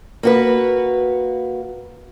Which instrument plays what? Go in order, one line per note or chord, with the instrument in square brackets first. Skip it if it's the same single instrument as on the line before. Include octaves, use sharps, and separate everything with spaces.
[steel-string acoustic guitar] A#3 F#4 B4